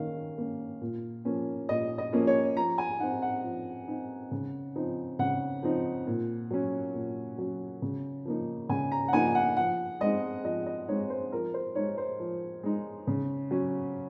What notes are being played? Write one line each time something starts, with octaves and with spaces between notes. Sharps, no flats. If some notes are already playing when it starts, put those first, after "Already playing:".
Already playing: D#3 A#3 C#4 F5
A#3 C#4
A#2
F3 A#3 C#4
A#2 D#5
D#5
F3 A#3 C#4
C#5
F3 A#5
G#5
C4 D#4 F#5
F#5
F3
C4 D#4
C#3
F3 C4 D#4
C#3 F#5
F3 C4 D#4
A#2
F#3 C#4
A#2
F#3 C#4
C#3
F3 A#3 D#4
C#3 G#5
A#5
F#5
F3 A#3 D#4 G#5
F#5
F3 F#5
G#3 C4 D#4 D#5
F3 D#5
D#5
G#3 C4 D#4 C#5
C5
F3 A#4
C5
G#3 D#4 C#5
C5
F3
G#3 D#4
C#3
F#3 C#4